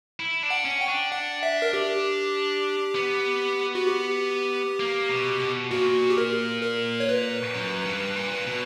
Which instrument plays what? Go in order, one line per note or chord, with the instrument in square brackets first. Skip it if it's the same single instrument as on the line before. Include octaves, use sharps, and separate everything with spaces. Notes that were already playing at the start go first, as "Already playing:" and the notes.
[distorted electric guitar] E4
D4
[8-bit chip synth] F#5
[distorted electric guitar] C#4
[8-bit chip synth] G5
[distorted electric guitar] D4
[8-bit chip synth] F#5
E5
A#4
G4
[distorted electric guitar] B3
[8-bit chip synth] F#4
G4
[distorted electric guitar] A#3
B2
B2
[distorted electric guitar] A#2 [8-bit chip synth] F#4
[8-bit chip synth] G4
A#4
A#4
C#5
B4
[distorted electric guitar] F#2
G2
A#2
B2